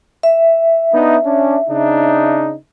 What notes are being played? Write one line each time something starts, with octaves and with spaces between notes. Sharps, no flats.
E5
B3 D4 D#4
C#4 D4
C#3 D4 D#4